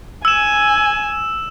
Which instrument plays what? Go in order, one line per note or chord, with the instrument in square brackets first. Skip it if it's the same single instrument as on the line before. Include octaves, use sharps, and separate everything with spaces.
[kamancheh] G#5 [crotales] E6 E7